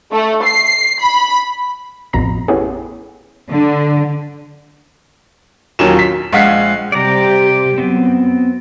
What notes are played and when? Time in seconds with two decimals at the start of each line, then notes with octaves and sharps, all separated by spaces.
0.12 A3
0.44 C7
1.01 B5
2.13 A1 F2 B2 A#5 B5
2.48 A3 B3 C#4 E4 G4 G#4
3.51 D3
5.79 D#2 A#2 D#3 F#3 C#4 E7
5.99 B6
6.33 A#1 G#3 F5 F#5 B6
6.92 C3 G3 G4 D5 A#5
7.78 F#2 B3 C4